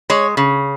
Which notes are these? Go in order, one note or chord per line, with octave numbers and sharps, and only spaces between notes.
G#3 C#5
C#3